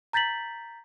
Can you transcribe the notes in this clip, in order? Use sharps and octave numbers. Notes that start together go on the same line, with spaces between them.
A#5 G6 A6 B6 F#7